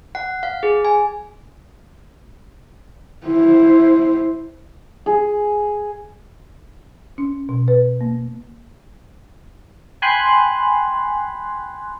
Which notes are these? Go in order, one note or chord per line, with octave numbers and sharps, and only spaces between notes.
F#5
F5
G#4
G#5
E4 C5
G#4
C#4
B2
B4
A#3
G5 G#5 B5 C6 F#6